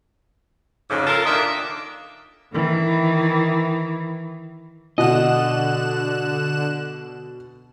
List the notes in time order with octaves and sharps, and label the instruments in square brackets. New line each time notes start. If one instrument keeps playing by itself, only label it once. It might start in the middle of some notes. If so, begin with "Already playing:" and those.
[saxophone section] F2 G#2 C#3
F4 A4 A#4
A#2 D#3 A#3 D4 D#5 E5
[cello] D#3 E3
[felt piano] B2 F#5 [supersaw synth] D3 F#6 E7 [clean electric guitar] D#5